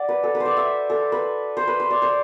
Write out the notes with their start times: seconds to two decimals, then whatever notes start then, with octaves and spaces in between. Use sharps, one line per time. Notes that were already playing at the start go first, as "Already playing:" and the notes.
Already playing: D5 F#5
0.09 B4
0.23 A4
0.35 B4
0.40 C5
0.45 D5
0.57 E5
0.90 A4
1.12 B4
1.57 C5
1.67 B4
1.80 C5
1.90 D5
2.02 C5